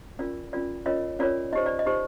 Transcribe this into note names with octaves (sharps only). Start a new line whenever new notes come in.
C#4 F4 A#4 D5
C#4 F4 A#4 D5
C#4 F4 A#4 C#5 D#5
C#4 F4 A#4 C#5 D5
D#4 G4 C5 D#5
D5
D#5
D#4 G4 C5